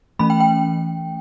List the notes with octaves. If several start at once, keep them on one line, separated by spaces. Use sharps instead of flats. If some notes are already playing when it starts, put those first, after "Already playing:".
E3 A3 C#4 B5
G5
G5